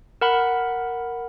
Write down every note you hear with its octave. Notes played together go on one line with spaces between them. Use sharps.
A#4 F#5 B5